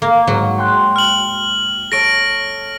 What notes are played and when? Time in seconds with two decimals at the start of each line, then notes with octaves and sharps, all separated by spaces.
0.02 A#3
0.27 G#2 F#3
0.58 G5 C6 F#6
0.96 F6 F#7
1.92 A4 C#5 A#6 D7